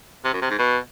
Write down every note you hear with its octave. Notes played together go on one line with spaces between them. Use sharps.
C3
F#2
C3
G#2
B2